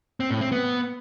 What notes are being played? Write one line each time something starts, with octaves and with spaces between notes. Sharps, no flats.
C4
A2
C4
B3